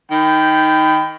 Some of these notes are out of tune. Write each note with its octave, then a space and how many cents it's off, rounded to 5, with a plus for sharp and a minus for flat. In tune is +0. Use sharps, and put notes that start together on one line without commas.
D#3 +5 G5 +0 B5 +25